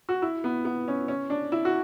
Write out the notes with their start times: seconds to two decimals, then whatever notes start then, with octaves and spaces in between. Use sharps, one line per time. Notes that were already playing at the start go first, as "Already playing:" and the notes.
0.09 F#4
0.22 E4
0.44 B3
0.65 B3
0.88 C#4
1.08 C#4
1.30 D4
1.52 E4
1.65 F#4